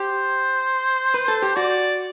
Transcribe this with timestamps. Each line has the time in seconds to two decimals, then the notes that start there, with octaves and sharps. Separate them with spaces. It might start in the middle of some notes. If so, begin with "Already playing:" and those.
Already playing: G4 C5
1.14 B4
1.28 A4
1.42 G4
1.56 F#4 D5